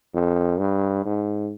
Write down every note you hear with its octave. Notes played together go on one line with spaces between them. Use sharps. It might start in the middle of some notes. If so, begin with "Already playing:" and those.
F2
G2
G#2